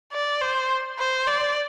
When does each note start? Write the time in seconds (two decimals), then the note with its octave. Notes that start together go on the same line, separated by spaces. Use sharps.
0.12 D5
0.41 C5
0.99 C5
1.27 D5